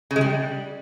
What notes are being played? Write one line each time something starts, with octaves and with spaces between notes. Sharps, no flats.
C#3
G#3
G3